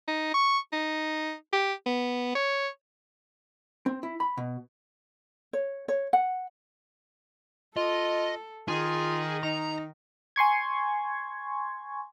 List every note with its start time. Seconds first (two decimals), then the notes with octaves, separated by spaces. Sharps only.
0.08 D#4
0.34 C#6
0.73 D#4
1.53 G4
1.86 B3
2.35 C#5
3.86 C4
4.03 E4
4.20 B5
4.37 B2
5.53 C#5
5.88 C#5
6.13 F#5
7.77 F4 A4 D#5
8.68 D#3 F4 G#4
9.43 D#4 A#5
10.36 G#5 C6 C#6 G#6